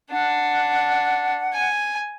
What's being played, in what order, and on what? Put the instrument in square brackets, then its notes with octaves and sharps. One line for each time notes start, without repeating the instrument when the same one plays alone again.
[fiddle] D4 [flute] F#5
[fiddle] G#5